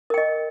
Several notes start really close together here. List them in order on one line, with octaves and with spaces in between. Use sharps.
A#4 G5 D#5